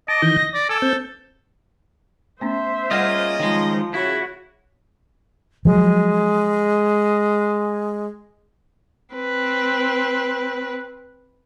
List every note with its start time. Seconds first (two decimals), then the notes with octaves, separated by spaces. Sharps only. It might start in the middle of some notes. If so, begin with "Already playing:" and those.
0.08 D#5 A5 D6
0.22 D#3 E3 G6
0.38 A#6
0.54 D5
0.69 A4 G#5 D6 E6
0.82 C4 G6
2.41 A3 B3 C#4 C5 E5
2.91 G3 A#3 C#4 F4 G#4 D#5 F#5
3.40 D#3 F3 G#3
3.94 C#3 E4 F#4 C#5
5.65 F3 F#3 G#3
9.14 C4 B4